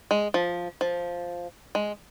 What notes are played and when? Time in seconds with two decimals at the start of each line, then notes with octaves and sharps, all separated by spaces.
0.11 G#3
0.34 F3
0.81 F3
1.75 G#3